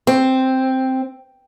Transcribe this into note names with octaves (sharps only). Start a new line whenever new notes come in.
C4